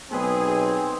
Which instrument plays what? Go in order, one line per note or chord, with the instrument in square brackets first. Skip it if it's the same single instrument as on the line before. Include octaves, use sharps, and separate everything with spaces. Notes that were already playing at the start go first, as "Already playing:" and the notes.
[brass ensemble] B1 G#4 [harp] B3 B4 D#6 [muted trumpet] C4